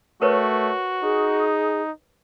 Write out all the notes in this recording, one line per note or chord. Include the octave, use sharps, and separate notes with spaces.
A3 F#4 A#4 B4 C#5
D#4 G#4